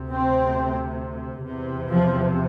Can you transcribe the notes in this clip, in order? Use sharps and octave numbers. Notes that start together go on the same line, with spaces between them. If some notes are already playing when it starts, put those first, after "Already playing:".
Already playing: D2 C3
C4
E2 C3
F3